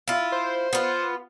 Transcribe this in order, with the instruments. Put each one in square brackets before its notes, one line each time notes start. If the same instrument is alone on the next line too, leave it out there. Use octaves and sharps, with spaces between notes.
[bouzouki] E4 F4
[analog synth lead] C5
[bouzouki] B3 F4